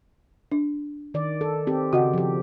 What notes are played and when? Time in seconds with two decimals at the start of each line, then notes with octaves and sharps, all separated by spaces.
0.52 D4
1.14 D#3 D5
1.41 A4
1.67 C4 G4
1.93 C#3 F#4 D#5 F#5
2.14 F3 G4